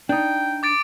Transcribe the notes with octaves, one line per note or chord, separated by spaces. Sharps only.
D4 D#4 G5
D6 A6 D7